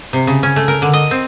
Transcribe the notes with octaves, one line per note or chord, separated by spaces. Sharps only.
C3
C#3
C#4
A3
A#4
D3
D#5
C4